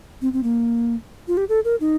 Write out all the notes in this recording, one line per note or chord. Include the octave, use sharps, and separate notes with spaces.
C4
C4
A#3
F4
G4
A4
A#4
D#4